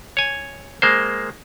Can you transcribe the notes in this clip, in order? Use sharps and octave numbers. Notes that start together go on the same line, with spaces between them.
C#5 G#5
G#3 A#3 C5